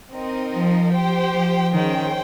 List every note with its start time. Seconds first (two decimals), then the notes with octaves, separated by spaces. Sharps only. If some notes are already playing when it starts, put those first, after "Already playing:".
0.12 C4 D#4 A#4 D#5
0.53 F3
0.93 G4 C5 G5
1.33 F3
1.73 D#3 C#4 G#4 C5 G5